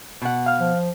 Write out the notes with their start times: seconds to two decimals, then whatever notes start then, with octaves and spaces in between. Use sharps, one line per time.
0.22 B2 F#5
0.46 F5 F6
0.60 F3